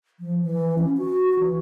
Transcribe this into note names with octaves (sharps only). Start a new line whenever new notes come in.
F3
E3
C#4
F#4
E3